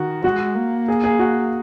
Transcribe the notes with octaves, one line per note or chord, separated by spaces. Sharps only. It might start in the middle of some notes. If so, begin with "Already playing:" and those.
Already playing: D#3 F#4
G#3 F#4
A#3
G#4
G#4
F#4